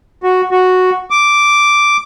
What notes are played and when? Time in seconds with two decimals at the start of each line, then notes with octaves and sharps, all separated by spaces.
0.23 F#4
0.51 F#4
1.10 D6